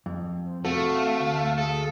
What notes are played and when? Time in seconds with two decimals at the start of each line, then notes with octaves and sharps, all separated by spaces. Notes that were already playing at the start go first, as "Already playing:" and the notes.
0.06 F2
0.46 C5
0.65 A3 C4 F#4 A4 F5
1.20 D2
1.58 G#4 A4